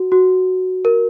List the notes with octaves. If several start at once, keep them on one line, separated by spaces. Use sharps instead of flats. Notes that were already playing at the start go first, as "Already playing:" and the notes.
Already playing: F#4
F#4
A#4